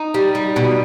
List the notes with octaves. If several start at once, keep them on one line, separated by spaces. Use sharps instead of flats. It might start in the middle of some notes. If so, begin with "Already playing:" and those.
Already playing: D#4
G3
G3
B2